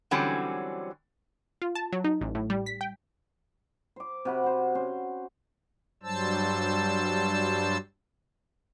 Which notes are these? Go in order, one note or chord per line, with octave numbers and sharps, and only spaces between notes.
D3 E3 F#3 G3 C4 C#4
F4
A5
F#3
D#4
A1
A2
G3
B6
G5
C5 D6
C3 F#4 B5
C5 F#5
C#4 C5
G2 F#3 G3 C5 A5 E6